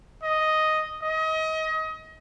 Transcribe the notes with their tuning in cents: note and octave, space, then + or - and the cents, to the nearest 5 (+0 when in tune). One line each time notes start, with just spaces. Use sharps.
D#5 +0
D#5 +30